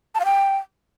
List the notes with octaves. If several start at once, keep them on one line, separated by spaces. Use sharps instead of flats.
A5
F5
G5